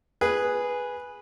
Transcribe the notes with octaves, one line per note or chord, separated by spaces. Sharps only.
G#4 B4